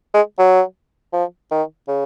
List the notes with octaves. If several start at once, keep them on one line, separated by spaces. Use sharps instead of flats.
G#3
F#3
F3
D#3
C#3